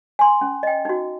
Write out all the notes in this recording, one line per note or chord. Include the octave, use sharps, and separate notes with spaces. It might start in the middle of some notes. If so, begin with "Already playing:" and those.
G#5 C6
C#4
D#5 G5
D#4 F#4